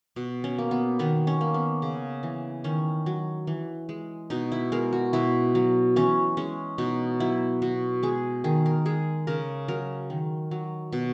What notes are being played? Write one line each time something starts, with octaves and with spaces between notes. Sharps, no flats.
B2
C#4
A#3
B3
D#3 B3
C#4
A#3
B3
C#3
E3
D#3 C#4
F#3
E3
G#3
B2 D#4
E4
G#3 A#4
F#4
B2 E4
F#3
E3 C#4
G#3 C#4
B2 D#4
F#3 E4
B2 F#4
G#3 G#4
D#3 G#4
A#4
G#3 G#4
C#3 A#4
F#3 A#4
D#3
F#3
B2